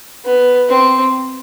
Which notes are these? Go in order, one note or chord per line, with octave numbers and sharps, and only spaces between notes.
B3
C4